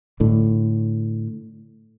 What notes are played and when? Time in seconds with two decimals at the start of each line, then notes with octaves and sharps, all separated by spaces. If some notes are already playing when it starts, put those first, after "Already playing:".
0.20 A2 D3